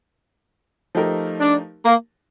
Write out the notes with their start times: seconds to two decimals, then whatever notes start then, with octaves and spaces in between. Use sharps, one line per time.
0.95 F3 A3 D#4 G4 A#4
1.41 D4
1.85 A#3